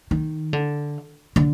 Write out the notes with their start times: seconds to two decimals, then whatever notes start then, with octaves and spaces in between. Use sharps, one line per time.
0.11 D#3
0.53 D3
1.36 D3